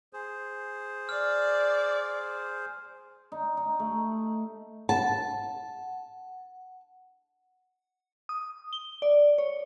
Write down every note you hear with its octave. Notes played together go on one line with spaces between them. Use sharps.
G#4 C5
D5 F6
D#4
D#4
A3
F#5 A5
D#6
G7
D5
C#5